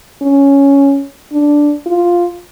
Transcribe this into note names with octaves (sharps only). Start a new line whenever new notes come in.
C#4
D4
F4